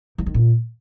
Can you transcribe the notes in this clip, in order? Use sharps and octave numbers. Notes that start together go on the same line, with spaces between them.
E3
D#3
A#2